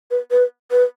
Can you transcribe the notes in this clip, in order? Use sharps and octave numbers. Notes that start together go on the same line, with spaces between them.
B4
B4
B4